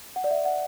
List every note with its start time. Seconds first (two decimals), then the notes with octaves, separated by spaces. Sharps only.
0.16 F#5
0.24 D5
0.31 E5
0.45 F#5